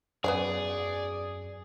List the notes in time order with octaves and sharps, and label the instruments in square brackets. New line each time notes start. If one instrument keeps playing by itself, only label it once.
[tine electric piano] F#2 [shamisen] B3 F5 G#5 [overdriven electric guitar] G#4 [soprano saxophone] D5